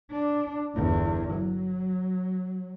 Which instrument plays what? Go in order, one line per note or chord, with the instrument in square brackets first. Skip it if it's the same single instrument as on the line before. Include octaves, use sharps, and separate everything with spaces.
[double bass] D4
G1 E2
F#3